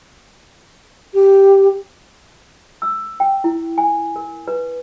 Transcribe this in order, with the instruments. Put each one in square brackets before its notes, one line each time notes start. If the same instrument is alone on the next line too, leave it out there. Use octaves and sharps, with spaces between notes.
[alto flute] G4
[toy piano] E6
G5
E4
G#5
A#4
B4